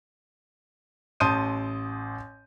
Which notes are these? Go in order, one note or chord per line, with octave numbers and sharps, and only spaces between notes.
A1 A5 C6 D#6 G6 D#7